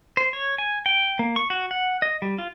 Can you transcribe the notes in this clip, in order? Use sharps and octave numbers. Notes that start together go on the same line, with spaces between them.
C5
C#5
G#5
G5
A#3
C#6
F#4
F#5
D#5
G3
F4